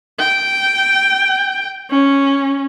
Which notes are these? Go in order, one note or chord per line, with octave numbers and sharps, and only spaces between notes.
G5
C#4